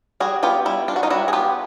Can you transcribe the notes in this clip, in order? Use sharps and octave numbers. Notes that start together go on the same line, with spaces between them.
G3 F#4 G#4
B3 F4 G4
G3 E4
D4 F4
F#4
D#4 F4
G3 E4 F#4
G#4
B3 F4 G4